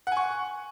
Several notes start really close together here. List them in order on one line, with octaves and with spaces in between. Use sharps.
F#5 G#5 C#6